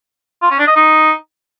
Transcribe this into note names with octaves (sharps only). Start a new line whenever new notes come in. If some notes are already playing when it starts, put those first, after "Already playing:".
F4
C#4
D4
D#5
D#4